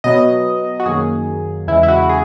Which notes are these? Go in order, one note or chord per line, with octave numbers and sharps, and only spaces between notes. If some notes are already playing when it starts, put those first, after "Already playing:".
B2 F#3 B3 D#5
F#4
F#2 D#3 F#3 A#3 G#4
E2 C#3 E3 G#3 E4
E4
F#4
G#4